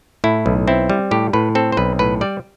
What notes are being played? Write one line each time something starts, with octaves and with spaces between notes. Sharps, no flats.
A2 E4
B1
C4 E4
G3
A2 G4
A2 B4
C4 A4
C5
B1 B4
A2 B4
G3 D5